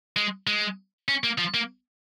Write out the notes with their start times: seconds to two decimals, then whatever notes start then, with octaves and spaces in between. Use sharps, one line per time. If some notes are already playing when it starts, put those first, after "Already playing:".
0.16 G#3
0.47 G#3
1.09 C#4
1.24 A#3
1.38 F3
1.54 A#3